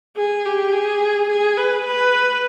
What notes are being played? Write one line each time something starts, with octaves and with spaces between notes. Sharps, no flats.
G#4
G4
G#4
G#4
B4
B4